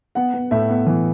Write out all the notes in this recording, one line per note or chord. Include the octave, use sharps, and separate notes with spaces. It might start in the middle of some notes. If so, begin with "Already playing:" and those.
B3 F#5
B3
A2 E5
B3
E3